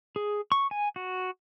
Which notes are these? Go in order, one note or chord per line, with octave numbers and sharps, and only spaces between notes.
G#4
C#6
G#5
F#4